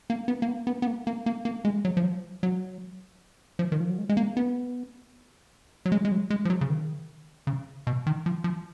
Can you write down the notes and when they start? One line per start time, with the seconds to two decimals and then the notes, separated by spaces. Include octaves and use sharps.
0.10 A#3
0.28 B3
0.42 A#3
0.48 B3
0.67 B3
0.82 B3
0.87 A#3
1.07 A#3
1.26 A#3
1.45 A#3
1.65 G#3
1.85 F#3
1.97 F3
2.04 F#3
2.43 F#3
3.59 F3
3.72 D#3
3.80 F3
3.89 F#3
3.98 G#3
4.09 G#3
4.17 A#3
4.37 B3
5.86 F#3
5.92 G#3
6.05 G#3
6.12 F#3
6.30 G#3
6.45 F3
6.50 F#3
6.61 C#3
6.70 D#3
7.47 C#3
7.87 B2
8.07 D#3
8.26 F3
8.44 F3